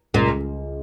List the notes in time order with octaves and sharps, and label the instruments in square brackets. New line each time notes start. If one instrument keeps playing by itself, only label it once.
[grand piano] C#2 [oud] A#2